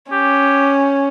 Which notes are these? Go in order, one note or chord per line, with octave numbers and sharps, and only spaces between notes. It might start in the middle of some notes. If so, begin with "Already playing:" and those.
C#4 G4